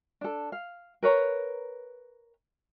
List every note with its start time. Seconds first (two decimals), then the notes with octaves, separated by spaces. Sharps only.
0.21 D4 A4
0.52 F5
1.03 A#4 B4 C#5 A#5